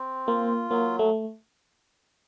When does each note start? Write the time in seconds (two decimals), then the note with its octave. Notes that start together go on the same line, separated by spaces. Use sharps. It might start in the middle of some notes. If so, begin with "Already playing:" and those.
Already playing: C4
0.27 A#3 F4
0.70 F#3 A#3
0.99 A3